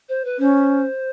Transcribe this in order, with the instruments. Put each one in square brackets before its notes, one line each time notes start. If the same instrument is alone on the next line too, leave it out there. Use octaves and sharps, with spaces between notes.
[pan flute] C5
B4
[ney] C#4 [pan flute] C5